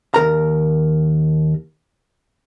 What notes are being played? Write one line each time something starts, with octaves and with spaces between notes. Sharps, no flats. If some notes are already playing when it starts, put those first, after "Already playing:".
D#2 A#4 A#5